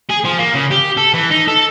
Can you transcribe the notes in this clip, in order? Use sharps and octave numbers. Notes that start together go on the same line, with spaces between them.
G#4
F3
A#3
C#3
G4
A4
E3
D#4
A4